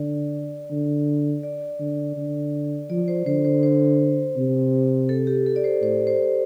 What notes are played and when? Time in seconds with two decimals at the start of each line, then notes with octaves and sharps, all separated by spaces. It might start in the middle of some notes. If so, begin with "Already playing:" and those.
Already playing: D3 D5
0.70 D3
1.43 D5
1.79 D3
2.17 D3
2.90 F3 D5
3.08 C5
3.26 D3 C5
3.45 C5
3.63 C5
4.37 C3
5.09 A4
5.27 G4
5.46 A4
5.56 D5
5.64 C5
5.82 A2 C5
6.07 C5